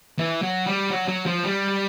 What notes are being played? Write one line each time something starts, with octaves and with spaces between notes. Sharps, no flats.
E3
F#3
G3
F#3
F#3
F3
G3